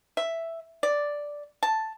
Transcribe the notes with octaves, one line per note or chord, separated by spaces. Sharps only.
E5
D5
A5